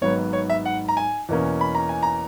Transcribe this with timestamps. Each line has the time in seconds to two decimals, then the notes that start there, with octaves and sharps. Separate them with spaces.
0.01 G#1 G#2 F#3 B3 C#5
0.33 C#5
0.50 E5
0.65 F#5
0.88 A#5
0.97 G#5
1.29 E2 B2 A#3 C#4
1.61 B5
1.75 A#5
1.89 G#5
2.03 A#5